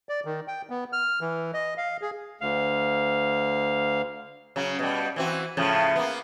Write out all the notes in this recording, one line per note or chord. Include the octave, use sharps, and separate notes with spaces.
D5
D#3
G5
B3
F6
E3
D#5
F5
G#4
D2 F5
C#3 F#3
B2 G3
E3 C4 F#4
A2 C#3 F3
A#3 B3